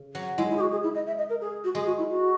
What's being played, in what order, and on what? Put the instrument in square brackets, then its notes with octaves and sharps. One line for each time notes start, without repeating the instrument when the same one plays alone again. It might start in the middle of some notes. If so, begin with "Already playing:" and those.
Already playing: [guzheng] C#3
F#3
[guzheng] G#3 [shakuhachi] E4
[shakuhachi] E4
G#4
F#4
G#4
E4
D#5
E5
D#5
A#4
G#4
F#4
[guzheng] G#3 [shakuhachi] G#4
[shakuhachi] F#4
E4
F#4